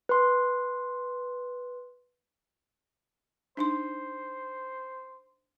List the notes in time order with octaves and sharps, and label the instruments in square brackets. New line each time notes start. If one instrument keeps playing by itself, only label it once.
[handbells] B4 C6
[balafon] D4 D#4 C6 [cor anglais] C5